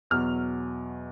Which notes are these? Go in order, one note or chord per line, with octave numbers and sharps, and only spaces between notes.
E2 B2 F#3 F6